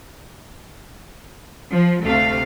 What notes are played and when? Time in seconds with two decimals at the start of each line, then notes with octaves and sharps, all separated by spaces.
1.73 F3
2.03 D2 C3 A3 F5